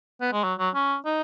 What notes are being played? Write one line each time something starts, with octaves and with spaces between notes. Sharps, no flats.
B3
G#3
F#3
F#3
C#4
D#4